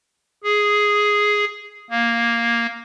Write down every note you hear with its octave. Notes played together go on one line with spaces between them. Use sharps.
G#4
A#3